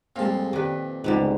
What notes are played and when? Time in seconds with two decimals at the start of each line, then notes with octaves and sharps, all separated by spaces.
0.16 F2 A#2 G3 G#3 A#3 F5 A5
0.53 D#3 G4 B4 D5
1.04 C#2 G#2 D3 G3 B3